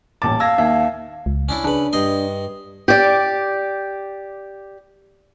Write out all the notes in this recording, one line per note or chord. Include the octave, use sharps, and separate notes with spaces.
D#1 A1 A5 D6
F5 E6 G#6 A#6
D#2 E5
C#2
C#4 D4 E4
C#3 D4 B4
G2 D#5 C6
G4 D5